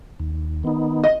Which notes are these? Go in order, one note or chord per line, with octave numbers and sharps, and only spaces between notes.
D#2
D#3 B3 D#4
D#5